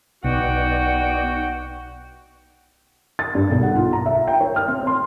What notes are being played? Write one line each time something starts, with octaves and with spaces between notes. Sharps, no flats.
B1 B3 D#4 F#4 D5 F#5 G5
A6
G2
B1
F#5
F4
A#5
E5
G5
C#5
F6
C4
C6